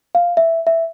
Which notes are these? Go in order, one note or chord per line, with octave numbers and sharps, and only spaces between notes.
F5
E5
E5